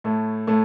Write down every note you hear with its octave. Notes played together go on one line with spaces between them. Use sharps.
A2 A3
A2 A3